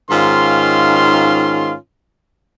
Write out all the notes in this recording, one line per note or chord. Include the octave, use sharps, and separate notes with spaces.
G#2 D#3 C#4 F4 F5 C6